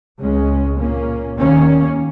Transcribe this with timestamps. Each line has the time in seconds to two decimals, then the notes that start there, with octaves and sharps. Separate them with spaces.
0.19 C#2 C#3 G#3 C#4
0.78 A#2 A#3 C#4
1.37 D#2 D#3 A#3 C#4